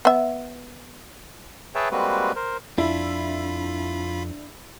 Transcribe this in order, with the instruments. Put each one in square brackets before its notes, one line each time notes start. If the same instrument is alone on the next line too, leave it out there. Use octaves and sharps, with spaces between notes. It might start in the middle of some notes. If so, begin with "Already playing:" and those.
[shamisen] B3 E5
[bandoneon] G#4 B4 C#5 E5 G5 A5
G3 G#3 A#3 C4 F#4 B4
A#4 C5
[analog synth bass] F2 [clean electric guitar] D4 [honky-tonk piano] E4 [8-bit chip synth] F4 B5